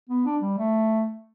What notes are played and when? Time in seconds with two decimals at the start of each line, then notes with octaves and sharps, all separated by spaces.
0.10 B3
0.25 D4
0.42 G3
0.58 A3